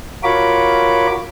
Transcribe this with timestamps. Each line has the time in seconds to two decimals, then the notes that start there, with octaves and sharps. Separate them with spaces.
0.24 F4 F#4 A#4 C#5 B5 D6